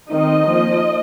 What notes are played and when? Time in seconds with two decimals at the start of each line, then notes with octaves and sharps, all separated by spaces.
0.10 D#3 C4 D#4 D#5
0.46 F3 A#3 D#4